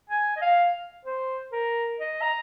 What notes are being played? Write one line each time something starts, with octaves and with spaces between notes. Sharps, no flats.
G#5
D#5
F5
C5
A#4
D#5
A#5